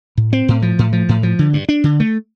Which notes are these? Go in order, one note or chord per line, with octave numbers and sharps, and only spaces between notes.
A2
C4
A2
F3
A2
F3
A2
F3
D3
G2
D4
D3
A3